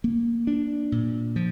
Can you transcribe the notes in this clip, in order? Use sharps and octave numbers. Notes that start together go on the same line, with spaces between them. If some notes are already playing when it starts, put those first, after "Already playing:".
A#3
D4
A#2
F3